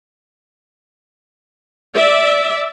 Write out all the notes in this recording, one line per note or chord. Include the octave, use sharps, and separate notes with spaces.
D5 E5